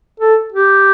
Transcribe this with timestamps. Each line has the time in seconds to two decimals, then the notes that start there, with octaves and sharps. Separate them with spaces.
0.20 A4
0.52 G4